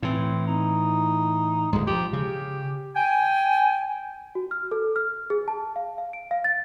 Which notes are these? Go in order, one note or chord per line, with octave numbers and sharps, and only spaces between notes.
A2 E3 C4
D#4
D#1 D2 G#2 G#3
F3 G4
C#3 G4
G5 G#5
F#4
F6
A4
F6
G#4
A5
F5
F5
D7
F5
A6